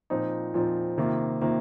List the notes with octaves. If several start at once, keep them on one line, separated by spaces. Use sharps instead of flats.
A#2 F3 C4 D#4
A#2 F3 C4 D#4
C3 D#3 A#3 F4
C3 D#3 A#3 F4